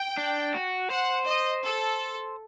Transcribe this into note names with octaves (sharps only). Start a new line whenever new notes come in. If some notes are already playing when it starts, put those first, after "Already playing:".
Already playing: G5
D4
F#4
C5 F#5
D#5
A4